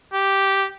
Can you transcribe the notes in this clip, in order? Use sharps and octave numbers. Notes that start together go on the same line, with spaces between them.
G4